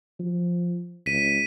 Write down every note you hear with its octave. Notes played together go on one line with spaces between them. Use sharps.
F3
C#2 B6 D#7